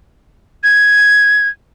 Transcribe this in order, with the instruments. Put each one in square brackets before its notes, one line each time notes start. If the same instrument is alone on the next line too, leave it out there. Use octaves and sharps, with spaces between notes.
[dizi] G#6